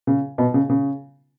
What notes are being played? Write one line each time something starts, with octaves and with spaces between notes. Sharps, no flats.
C#3
B2
C#3
C#3